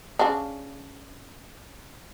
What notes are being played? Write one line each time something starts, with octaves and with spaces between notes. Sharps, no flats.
C#3 D4